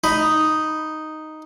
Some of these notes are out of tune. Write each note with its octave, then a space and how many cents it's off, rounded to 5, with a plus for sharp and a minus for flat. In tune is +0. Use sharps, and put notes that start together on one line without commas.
D#4 +0 B5 +0